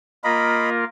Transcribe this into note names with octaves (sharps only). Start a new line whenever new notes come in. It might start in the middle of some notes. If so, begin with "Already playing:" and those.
A#3 F4 A#4 D#5 B5